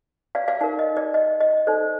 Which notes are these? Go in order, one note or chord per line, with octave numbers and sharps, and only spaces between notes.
D5 F5
D5 F5
D#4 A#4 D5 F5
D#5
D5
D#5
D#5
D#4 A4 C5 D5